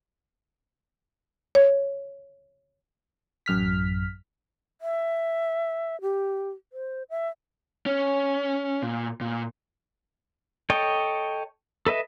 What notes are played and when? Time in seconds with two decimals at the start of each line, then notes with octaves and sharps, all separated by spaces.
1.55 C#5
3.46 A1 F#2 F6 B6
4.81 E5
6.02 G4
6.73 C5
7.10 E5
7.86 C#4
8.82 A#2
9.21 A#2
10.70 A4 C#5 D#5 G5
11.86 A4 B4 D#5 E5